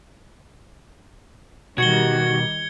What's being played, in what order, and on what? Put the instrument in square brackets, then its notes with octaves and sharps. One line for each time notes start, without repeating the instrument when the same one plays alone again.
[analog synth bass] B2 [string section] D#3 G3 [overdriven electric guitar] F#4 [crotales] G#6 C#7 G7